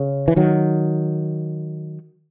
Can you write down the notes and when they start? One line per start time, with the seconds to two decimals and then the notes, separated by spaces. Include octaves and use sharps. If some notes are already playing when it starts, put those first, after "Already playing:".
Already playing: C#3
0.28 E3
0.36 D#3 F#3